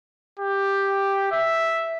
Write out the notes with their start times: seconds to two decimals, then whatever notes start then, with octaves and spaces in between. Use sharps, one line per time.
0.39 G4
1.32 E5